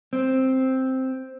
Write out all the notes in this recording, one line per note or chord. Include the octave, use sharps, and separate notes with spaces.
C4